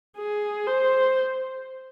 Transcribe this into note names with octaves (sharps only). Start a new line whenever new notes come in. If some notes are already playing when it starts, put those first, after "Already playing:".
G#4
C5